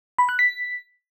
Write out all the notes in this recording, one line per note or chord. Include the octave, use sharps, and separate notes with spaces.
B5
F#6
B6